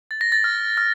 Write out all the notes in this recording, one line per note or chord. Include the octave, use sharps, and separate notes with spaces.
A6
A#6
A6
F6
F6